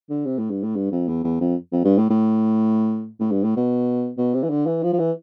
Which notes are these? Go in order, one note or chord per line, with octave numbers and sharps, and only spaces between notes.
D3
C3
A2
G2
A2
G2
F2
E2
E2
F2
F2
G2
A2
A2
A2
G2
A2
B2
B2
C3
E3
D3
E3
F3
F3
E3